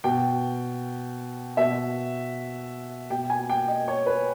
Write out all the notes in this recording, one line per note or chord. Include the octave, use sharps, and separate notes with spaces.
B2 G5
B2 E5
B2 G5
G#5
G5
D#5
C#5
B4